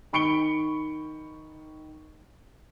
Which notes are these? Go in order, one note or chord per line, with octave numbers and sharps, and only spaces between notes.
D#3 B5 C#6 C#7 D7 G7